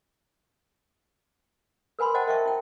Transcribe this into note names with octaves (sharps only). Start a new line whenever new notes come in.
A#4 B4 G#5 B5 C6
C5 D#5 F#5 G5 A5
A#4 D#5 E5 G5 A5 C#6
E4 G5